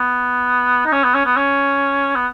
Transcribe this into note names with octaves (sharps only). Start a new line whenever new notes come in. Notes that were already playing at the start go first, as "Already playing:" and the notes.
Already playing: B3
D#4
C#4
B3
C#4
B3
C#4
B3